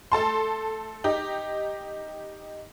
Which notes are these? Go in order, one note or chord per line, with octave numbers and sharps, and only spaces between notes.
A3 A4 A5 C6
D#4 G4